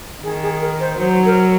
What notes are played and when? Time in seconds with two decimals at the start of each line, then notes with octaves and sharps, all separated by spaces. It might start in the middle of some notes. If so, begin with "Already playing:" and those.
0.23 D#3 G#4
0.42 G#4
0.61 A#4
0.80 C5
0.99 F#3 C5
1.25 A#4